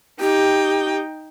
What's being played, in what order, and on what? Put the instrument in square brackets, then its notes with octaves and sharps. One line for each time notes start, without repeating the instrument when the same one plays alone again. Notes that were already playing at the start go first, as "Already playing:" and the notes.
[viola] D#4 G5 [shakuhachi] G4